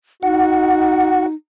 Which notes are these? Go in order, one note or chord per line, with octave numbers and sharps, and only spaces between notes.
D#4 F#4 F#5